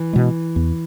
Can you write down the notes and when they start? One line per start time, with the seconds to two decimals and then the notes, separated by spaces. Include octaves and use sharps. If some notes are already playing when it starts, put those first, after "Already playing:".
Already playing: E3
0.13 B2 G#3
0.56 E2